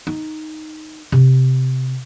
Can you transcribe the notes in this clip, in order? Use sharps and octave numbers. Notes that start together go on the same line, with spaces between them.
D#4
C3